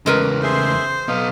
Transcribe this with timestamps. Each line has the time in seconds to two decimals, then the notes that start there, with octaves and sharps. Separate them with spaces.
0.06 E2 C#3 G#3 A#4 B4
0.43 G#4 C5 E5 C6
1.08 B1 B3 D#5 F5